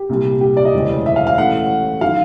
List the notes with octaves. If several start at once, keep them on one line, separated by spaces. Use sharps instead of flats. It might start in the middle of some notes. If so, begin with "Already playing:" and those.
Already playing: G4
C2 A#2 G3
G4
D5
D#5
E1 D2 C#3 E3
E5
F5
F5
A1 A2 E3 A3 F#5
D#3 F#3 F5